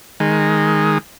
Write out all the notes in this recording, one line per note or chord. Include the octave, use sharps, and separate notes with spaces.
D#3 G#3